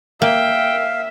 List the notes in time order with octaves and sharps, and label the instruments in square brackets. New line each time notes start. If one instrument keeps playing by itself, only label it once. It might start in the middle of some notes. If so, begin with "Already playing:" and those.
[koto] A#3 [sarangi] E5 [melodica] F5 [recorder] G5